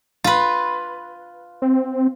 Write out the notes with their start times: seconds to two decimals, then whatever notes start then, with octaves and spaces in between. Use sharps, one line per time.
0.24 F4 B4
1.62 C4